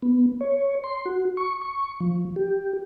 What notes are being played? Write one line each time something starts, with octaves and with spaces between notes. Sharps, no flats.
B3
C#5
C6
F#4
C#6
C#6
F3
G4